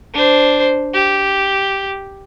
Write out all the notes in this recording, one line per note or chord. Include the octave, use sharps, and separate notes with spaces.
D4 C5
G4